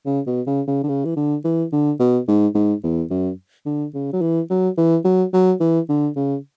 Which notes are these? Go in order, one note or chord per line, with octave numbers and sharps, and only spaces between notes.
C#3
B2
C#3
C#3
D3
C#3
E3
D3
E3
D3
B2
G#2
G#2
E2
F#2
D3
C#3
F#3
E3
F#3
E3
F#3
F#3
E3
D3
C#3